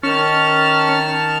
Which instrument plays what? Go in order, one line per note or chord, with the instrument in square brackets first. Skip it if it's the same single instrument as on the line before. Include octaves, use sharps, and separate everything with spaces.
[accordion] D#3 A5 F6 [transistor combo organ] C#4